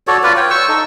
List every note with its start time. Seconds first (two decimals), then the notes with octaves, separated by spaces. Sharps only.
0.07 F#4 A4 C#5 D5
0.23 F4 B4 D5
0.37 C#5 G5
0.50 C#6 E6
0.69 D#4 A4